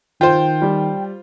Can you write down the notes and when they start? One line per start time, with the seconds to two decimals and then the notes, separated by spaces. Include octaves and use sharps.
0.21 D#3 F4 C5 G5
0.62 G3